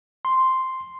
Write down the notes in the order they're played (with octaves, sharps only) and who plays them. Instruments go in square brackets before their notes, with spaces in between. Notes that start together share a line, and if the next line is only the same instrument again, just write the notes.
[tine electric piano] C6